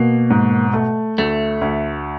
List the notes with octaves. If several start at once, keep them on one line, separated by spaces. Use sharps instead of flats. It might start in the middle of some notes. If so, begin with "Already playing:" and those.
Already playing: B2 A#3
G#2
A3
D2 A3
D2